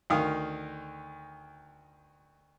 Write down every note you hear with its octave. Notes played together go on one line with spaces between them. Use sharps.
D2 D#3 F5 D#6